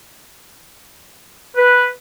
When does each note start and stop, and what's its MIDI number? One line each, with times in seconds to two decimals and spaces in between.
1.57 1.88 71